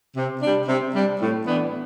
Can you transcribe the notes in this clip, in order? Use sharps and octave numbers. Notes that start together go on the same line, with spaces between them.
C3
G3 D4
C3
G3 D4
A2
E3 B3 D4